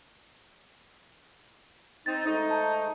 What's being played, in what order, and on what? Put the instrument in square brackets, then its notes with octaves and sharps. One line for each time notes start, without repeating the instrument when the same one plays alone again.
[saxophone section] C4 D#4 [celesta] A6
[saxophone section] G#2 A3 D#4
[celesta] A5 A#5